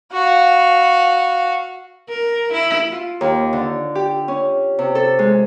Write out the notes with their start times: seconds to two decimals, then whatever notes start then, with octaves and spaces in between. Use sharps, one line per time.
0.12 F#4 F5
2.09 A#4
2.52 E4
2.92 F4
3.21 D#2
3.53 D3
3.95 G4
4.28 C#4
4.79 C3
4.95 A4
5.19 G#3